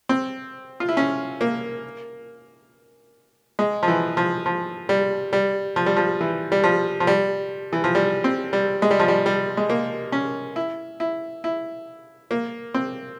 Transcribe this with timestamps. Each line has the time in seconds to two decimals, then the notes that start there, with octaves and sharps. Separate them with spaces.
0.09 C4
0.80 F4
0.89 E4
0.97 C#4
1.41 A#3
3.59 G#3
3.83 F3
3.88 E3
4.17 F3
4.46 F3
4.89 G3
5.33 G3
5.76 F3
5.86 G3
5.97 F3
6.21 E3
6.52 G3
6.64 F3
7.00 F3
7.07 G3
7.73 E3
7.84 F3
7.95 G3
8.24 C4
8.53 G3
8.82 G#3
8.91 G3
9.00 F3
9.08 G3
9.26 G3
9.57 G#3
9.70 A#3
10.12 C#4
10.56 E4
11.00 E4
11.44 E4
12.31 A#3
12.74 C4